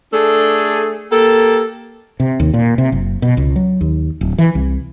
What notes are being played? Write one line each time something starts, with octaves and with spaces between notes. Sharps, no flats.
A3 D4 G#4 A4
A#3 G4 A4
C3
D#2
A#2
C3
F#1
B2
C#2
F#3
D#2
D1
E3
C2